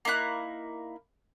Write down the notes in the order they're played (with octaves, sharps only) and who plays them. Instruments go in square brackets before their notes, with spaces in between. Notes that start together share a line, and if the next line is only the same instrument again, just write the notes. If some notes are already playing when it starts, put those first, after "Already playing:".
[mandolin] A#3 D#4 E4 F#6